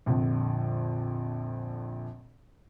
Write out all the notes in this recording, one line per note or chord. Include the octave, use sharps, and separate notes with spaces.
A#1 F2 D3